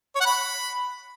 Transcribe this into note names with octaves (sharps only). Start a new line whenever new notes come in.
C#5
F#5
B5